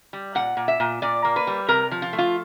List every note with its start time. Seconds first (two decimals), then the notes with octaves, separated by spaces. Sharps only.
0.13 G3
0.35 A#2 F#5
0.57 A#2
0.68 E5
0.80 A#2
1.02 A#2 D5
1.25 A#3
1.36 B4
1.47 G3
1.69 C3 A#4
1.91 F3
2.02 F4
2.13 A3
2.18 F4